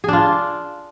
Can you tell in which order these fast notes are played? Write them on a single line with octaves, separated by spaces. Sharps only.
G#4 D4 F4